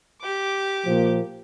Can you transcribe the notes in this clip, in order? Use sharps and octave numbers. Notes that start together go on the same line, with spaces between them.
G4 D6
A#2 F3 A#3